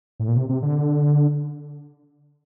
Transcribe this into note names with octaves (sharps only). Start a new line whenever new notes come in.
A2
A#2
C3
C3
D3